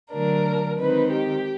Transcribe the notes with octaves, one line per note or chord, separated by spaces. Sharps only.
D3 F#3 A3 D4 A#4
D#3 G#3 C4 D#4 B4
G4